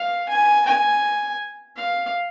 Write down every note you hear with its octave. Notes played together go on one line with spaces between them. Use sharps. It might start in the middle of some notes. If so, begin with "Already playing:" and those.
Already playing: F5
G#5
G#5
F5